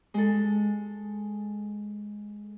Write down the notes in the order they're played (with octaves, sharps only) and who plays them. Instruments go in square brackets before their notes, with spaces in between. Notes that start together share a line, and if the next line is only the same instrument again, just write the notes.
[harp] G#3 A4